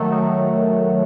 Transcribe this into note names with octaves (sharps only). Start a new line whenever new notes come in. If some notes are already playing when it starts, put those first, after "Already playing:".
Already playing: D#3 F#3 A3
D#3